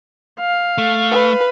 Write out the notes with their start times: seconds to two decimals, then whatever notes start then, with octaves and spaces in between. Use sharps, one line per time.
0.40 F5
0.78 A3
1.11 B4